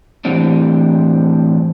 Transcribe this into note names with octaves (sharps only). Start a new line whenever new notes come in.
A2 E3 G3 C4 D4